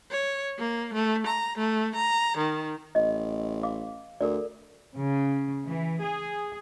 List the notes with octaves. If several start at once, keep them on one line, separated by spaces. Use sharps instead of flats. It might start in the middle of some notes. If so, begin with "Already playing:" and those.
C#5
A#3
A3
A#5
A3
A#5
D#3
A1 D#5
F5 D6
D2 A4 A#4 D5
C#3
E3
G#4